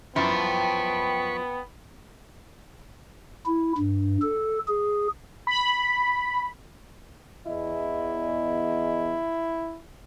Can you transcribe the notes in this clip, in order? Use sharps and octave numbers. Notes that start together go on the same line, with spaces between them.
F#2 F3 B3 E4 G5 A5 B5 C#6
E4
G2
A4
G#4
B5
E2 E4 D#5